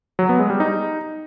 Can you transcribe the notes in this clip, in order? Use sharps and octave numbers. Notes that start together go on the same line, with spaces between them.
F#3
B3
G#3
G3
D#4